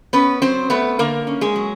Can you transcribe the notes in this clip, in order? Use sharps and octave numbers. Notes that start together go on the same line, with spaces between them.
B3 C#4 B4
F#3 C4 C5
A3 B3 B4
D3 A#3 A#4
C#4
G#3 G#4
F#3